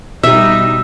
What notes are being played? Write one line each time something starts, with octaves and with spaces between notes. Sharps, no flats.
B2 G3 D#4 G4 E5 E6